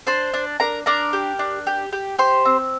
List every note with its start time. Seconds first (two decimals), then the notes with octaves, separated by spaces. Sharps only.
0.07 D4 C5 C6
0.34 D4
0.60 D4 A#4 A#5
0.86 D4 A#4 A#5
1.13 G4
1.39 D4
1.67 G4
1.92 G4
2.19 G4 C5 C6
2.45 C4